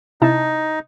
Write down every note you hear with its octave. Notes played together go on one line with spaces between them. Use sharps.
C3 D#4 E4 A5